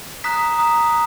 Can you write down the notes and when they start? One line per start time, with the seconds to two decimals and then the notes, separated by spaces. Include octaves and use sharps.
0.24 A#5 D#6 F#6 B6
0.58 A#5 D#6 F#6